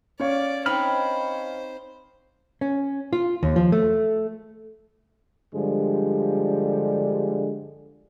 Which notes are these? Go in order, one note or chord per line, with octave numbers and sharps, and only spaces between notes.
C#4 C#5 D5 F5
C4 D#4 C5 B5 F6
C#4
F4
D#2
F3
A3
G2 D3 F3 G3 G#3